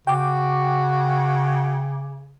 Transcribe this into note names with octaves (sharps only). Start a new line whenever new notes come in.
C#3 F#4 G5 D6